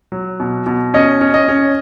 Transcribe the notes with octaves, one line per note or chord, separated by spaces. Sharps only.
F#3
B2
B2
C#4 D#5
C#4
D#5
C#4